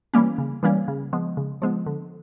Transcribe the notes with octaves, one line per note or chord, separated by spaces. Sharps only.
E3 G3 A#3 C#4
C#3
E3 G3 A#3 C#4
C#3
F3 G#3 B3
C#3
F3 G#3 B3
D3